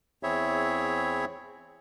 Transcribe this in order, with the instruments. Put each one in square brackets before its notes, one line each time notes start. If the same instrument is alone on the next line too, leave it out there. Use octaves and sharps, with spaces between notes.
[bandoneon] E2 C4 E4 G#4 C#5 E5